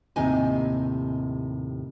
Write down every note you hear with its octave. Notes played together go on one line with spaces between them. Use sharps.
D#2 A2 C3 D#4 D#5 G#5